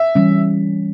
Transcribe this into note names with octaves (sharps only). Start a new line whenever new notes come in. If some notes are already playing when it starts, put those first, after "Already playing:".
Already playing: E5
E3 G3 C#4